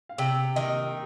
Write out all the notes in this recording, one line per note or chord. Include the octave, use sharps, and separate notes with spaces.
F5
C3 G5
D#3 D#5